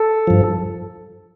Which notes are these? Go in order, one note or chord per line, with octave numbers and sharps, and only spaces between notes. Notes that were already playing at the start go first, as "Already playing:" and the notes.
Already playing: A4
G2 F3